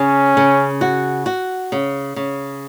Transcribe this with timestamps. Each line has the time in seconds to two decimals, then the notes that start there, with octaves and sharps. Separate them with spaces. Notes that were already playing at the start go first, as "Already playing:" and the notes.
Already playing: C#3 C#4
0.37 C#3
0.81 F#4
1.26 F#4
1.72 C#3
2.16 C#3